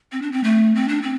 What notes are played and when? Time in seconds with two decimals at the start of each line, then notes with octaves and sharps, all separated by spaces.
0.12 C4
0.22 D4
0.32 C4
0.44 A3
0.75 C4
0.88 D4
1.02 C4